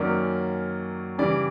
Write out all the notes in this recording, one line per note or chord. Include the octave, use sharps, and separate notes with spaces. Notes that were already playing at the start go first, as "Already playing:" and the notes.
Already playing: F#2 D#3 F#3 A#3 C#4 D5
C#3 E3 G3 D5